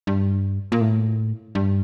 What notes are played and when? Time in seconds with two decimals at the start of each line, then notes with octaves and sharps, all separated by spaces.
0.07 G2
0.72 A#2
0.81 A2
1.55 G2